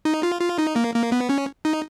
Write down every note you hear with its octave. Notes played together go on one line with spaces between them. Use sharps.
D#4
F4
F4
D#4
A#3
A#3
B3
C#4
D#4